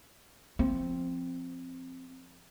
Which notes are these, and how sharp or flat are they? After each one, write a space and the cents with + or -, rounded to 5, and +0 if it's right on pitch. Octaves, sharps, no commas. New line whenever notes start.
F3 -15 C4 +0